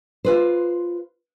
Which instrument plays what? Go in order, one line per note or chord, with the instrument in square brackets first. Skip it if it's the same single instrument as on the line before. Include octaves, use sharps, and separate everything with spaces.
[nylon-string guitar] F4 B4 C5